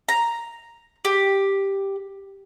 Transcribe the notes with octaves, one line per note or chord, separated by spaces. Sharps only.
A#5
G4